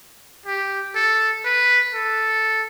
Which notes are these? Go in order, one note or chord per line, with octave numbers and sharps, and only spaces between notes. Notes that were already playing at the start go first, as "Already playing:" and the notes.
G4
A4
B4
A4